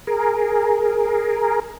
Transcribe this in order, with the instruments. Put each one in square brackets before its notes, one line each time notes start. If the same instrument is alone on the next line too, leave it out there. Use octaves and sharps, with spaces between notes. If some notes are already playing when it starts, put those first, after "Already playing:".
[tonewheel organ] G#4 A#4